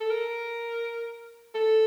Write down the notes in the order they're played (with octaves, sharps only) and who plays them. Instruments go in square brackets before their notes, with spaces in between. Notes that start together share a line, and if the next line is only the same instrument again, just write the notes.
[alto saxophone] A4
A#4
A4